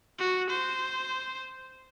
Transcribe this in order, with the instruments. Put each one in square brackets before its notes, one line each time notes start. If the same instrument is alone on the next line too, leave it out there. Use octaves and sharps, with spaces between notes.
[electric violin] F#4
C5